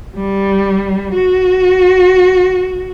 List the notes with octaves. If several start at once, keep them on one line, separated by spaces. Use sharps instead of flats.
G3
F#4